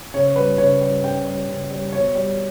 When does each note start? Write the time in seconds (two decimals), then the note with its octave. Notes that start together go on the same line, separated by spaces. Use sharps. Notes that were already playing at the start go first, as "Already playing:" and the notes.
0.14 C#3 C#5
0.36 G3 B4
0.58 C#3 C#5
0.81 G3
1.03 C#3 G5
1.25 G3
1.49 C#3
1.71 G3
1.92 B2 C#5
2.15 G3